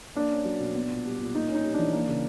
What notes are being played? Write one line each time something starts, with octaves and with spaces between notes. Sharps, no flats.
A#3 D4
C#4
F#3
B2
B3
A#2
G3
A#2
A#3 D#4
C#4
D#4
G3
E3 D4
A#3
C#3